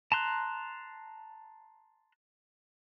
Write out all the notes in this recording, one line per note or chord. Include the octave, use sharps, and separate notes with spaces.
A5 A#5 C6 F#6